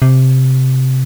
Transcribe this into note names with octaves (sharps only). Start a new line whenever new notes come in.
C3